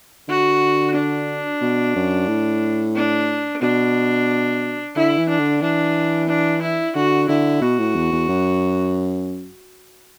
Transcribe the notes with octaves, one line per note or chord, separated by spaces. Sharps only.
D3 F#4
D4
B2
F#2
A2
D4
B2 D4
D3 E4
E3
D4
D3
E3 D4
D4
E4
D3 F#4
D3 E4
B2 F#4
A2
E2
E2
F#2